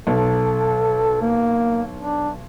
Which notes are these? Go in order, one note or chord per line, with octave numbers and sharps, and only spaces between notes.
B1 A4
A#3
D4